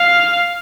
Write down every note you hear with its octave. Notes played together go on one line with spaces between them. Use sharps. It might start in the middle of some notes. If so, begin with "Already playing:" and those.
Already playing: F5